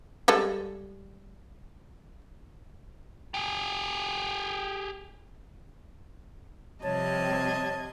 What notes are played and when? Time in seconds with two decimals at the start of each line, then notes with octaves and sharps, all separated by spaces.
0.28 G3 G#3 A4
3.34 G4 G#4
6.83 C3 F3 G3 C4 C#5 D#5 A5 G#6